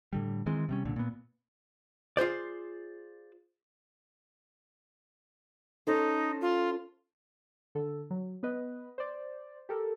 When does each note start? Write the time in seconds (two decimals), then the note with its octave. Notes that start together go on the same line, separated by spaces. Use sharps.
0.13 A2 D3 G3
0.46 D#3 E3 G#3 C4
0.69 C3 G3 C#4
0.85 C2 A#2 D3
0.96 A#2 B3
2.17 F4 G#4 C5 D5
5.87 C#4 D#4 A4 C5
6.41 F4
7.75 D3 A4
8.10 F#3
8.43 B3 B4 D#5
8.98 C5 D5
9.69 G4 A4 A#4